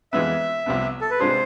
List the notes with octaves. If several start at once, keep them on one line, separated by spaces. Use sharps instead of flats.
F2 E3 G#3 B3 E5
C2 C3 F3 B3
A4
B4
C3 G#3 D4 F4 G#4 C5